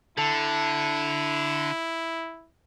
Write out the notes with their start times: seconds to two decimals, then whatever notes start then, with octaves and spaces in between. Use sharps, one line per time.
0.18 D3 E4 A4 A5